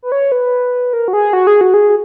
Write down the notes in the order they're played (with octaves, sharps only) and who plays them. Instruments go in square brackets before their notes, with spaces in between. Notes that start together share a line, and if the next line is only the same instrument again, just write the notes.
[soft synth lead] B4
C#5
B4
A#4
F#4
G#4
F#4
G#4
F#4
G#4